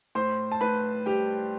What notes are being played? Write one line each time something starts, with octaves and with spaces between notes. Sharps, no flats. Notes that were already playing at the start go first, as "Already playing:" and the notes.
A2 C5 C6
A5
A2 B4 B5
G3 G4 G5